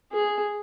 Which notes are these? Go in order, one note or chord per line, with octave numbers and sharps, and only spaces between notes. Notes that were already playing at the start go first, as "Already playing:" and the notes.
G#4